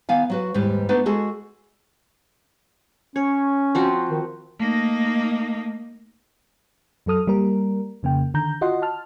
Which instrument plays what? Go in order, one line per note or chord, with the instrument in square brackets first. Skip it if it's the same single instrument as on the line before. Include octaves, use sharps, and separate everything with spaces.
[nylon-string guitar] D#3 B3 F5 G#5
F#3 F#4 B4
D#2 G#2 G3 B4
A3 B3 D4 D#4 B4
G#3 F#4 G#4 A4
[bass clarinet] C#4 [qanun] C#5
[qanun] F3 C4 F#4
[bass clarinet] D#3
[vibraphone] A3 [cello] A#3 D#4
[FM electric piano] F#2 F#3 A4 D#6 F6
G3 A#3 A#4
F2 C#3 A#3 G5
D3 D#3 A#5 G6
F4 F#4 D#5 F#5 C6
A5 F6